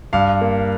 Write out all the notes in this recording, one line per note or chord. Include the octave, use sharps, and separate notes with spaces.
G2 F5
A#3